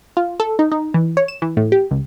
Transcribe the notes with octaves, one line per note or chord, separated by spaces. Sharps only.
F4
A4
D#4
D#4
E3
C#5
E7
E3
A2
G4
C#2